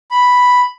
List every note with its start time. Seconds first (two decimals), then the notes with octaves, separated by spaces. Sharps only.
0.11 B5